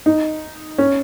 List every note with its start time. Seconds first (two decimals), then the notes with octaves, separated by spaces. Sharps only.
0.06 D#4
0.78 C#4